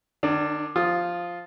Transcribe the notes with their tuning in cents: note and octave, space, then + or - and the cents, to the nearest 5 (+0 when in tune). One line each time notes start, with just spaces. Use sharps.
D#3 -40 D4 +0
F3 +0 F4 +0 D#6 +0